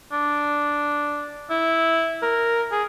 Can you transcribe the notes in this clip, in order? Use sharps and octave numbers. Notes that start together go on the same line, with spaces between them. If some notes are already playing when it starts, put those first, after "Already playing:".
D4
E4
A#4
G#4